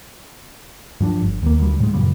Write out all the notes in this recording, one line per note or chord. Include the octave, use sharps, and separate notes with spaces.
G2 F3 D4
G1
D#2 A#3
D2 G3
A2 G#3
F#2 A#2 C#3 G3